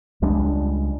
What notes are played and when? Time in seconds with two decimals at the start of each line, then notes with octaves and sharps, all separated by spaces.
0.22 C#2 G3 G#3 D4